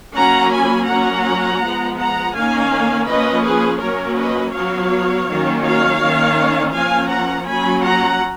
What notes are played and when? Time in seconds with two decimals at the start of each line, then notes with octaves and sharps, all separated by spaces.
0.17 F#3 A#3 C#4 F#5 A#5
0.53 G#5 B5
0.90 F#3 A#3 C#4 F#5 A#5
1.63 F3 G#3 B3
1.99 F#5 A#5
2.36 D#3 A#3 C#4 F5 G#5
3.09 F3 A#3 C#4 B4 D#5
3.46 G#4 B4
3.82 F#3 A#3 C#4 A#4 C#5
4.19 B4 D#5
4.55 F#3 B3 C#5 F5
5.28 D#3 F#3 A#3 C#4
5.65 C#5 F5
6.01 D#3 A#3 C#4
6.75 F3 A#3 C#4 F5 G#5
7.11 F#5 A#5
7.48 F#3 A#3 C#4 G#5 B5
7.84 F#5 A#5